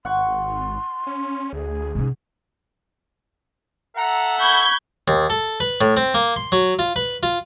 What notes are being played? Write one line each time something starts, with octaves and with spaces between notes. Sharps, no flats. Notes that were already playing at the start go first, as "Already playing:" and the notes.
G#1 F#5 C6 C#6
C#4
D2 G#4
G#2 C3 C#4
A4 E5 F#5 A#5
B5 C#6 G6 G#6
D#2
A4
B4
A2
C4
A#3
C6
F#3
F4
B4
F4